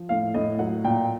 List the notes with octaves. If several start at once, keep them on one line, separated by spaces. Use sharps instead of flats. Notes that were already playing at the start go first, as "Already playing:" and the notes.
Already playing: F3
A2 F5
A2 D#5
F#3 F#5
A#2 G5